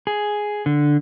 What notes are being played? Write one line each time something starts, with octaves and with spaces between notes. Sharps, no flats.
G#4
D3